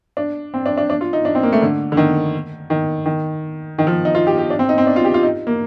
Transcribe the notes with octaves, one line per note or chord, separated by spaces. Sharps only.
D4
C4
D4
D4
D4
F4
D#4
D4
C4
A#3
A3
D3
D3
D#3
D#3
D#3
D#3
F3
D#4
F4
G4
G4
D4
C4
D#4
C4
D4
F4
G4
F4
D#4
A#3